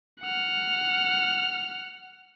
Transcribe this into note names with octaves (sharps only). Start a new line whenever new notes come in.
F#5 F6